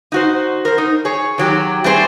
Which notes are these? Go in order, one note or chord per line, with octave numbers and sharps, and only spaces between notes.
D#4 F#4 C5
A#4 C5
D#4
G#4 C#5
D#3 F#3 G4
G3 A3 C4 G#4 C5 C#5